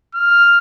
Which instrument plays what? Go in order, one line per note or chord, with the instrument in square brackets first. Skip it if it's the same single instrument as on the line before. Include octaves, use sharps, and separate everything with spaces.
[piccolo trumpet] F6